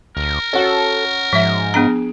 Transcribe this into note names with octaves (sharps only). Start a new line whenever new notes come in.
D2 A#4
C#4 F#4 A4
G#2 F3 E5
B3 D4 G#4 A#5 D7